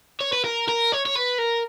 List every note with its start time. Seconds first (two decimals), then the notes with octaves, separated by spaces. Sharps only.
0.20 C#5
0.33 B4
0.45 A#4
0.68 A#4
0.92 C#5
1.06 C#5
1.15 B4
1.38 A#4